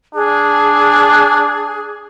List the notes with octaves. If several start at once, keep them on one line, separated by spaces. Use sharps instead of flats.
D4 G#4